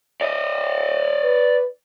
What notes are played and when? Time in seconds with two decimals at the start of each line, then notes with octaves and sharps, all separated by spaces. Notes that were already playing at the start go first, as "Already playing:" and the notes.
0.21 D5 D#5
1.24 B4